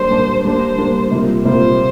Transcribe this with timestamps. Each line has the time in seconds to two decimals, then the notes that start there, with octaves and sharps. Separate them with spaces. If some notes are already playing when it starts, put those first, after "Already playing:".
Already playing: G3 A#3 D4 C5
0.10 G3 A#3 D4
0.44 G3 A#3 D4 C5
0.78 G3 A#3 D4
1.11 C3 G3 A#3 F4
1.45 C3 G3 A#3 F4 C5